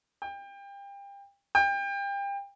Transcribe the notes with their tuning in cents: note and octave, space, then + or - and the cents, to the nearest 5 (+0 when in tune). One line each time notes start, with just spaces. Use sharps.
G5 +30
G5 +30